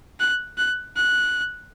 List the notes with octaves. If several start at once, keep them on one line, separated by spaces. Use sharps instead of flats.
F#6
F#6
F#6